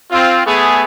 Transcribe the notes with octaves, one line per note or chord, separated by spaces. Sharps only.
C4 F4
A3 B3 G#4